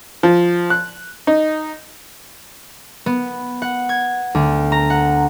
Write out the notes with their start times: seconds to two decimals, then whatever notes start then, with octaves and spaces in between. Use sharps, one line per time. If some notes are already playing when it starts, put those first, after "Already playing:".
0.23 F3
0.70 F#6
1.27 D#4
3.06 B3
3.62 F#5
3.89 G#6
4.35 D2
4.72 A#5
4.90 F#5